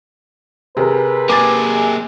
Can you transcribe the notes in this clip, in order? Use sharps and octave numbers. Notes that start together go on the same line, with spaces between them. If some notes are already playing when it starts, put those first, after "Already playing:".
C3 G#4 A#4 B4
A#3 G#4 D6 A6